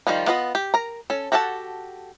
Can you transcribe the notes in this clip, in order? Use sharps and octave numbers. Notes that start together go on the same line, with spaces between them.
D#3 F3 G3 F4
B3 F4 B4 D#5
G4
A#4 A#5
C#4 A4
F#4 G4 A4 F#5 A5